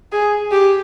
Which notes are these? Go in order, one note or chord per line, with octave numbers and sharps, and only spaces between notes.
G#4
G4